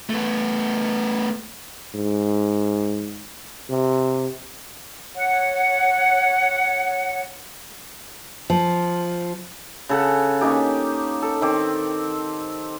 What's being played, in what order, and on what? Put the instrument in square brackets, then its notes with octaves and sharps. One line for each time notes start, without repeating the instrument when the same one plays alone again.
[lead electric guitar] A3 B3
[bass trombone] G#2
C3
[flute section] C#5 F#5
[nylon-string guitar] F3
[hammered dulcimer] C#3 A4 F#5
A#3 C#4 D#4 G4
A4
D#3 C4 D6